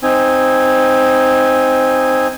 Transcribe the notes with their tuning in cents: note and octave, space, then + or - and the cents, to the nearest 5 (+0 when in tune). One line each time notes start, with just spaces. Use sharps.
C4 +0 D#4 +0 G#5 -10